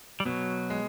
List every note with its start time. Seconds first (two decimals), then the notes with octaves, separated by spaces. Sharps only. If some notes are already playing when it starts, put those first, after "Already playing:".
0.20 G3
0.25 B2 F#3
0.70 G#3